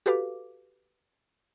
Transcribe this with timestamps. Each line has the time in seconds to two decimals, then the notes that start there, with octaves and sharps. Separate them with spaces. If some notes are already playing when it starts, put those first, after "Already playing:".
0.06 F#4 G4 A4 B4 F5 D6